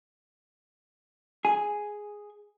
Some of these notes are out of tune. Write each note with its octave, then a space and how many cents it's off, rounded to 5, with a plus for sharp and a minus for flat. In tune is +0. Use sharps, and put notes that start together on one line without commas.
G#4 +0 G#5 +0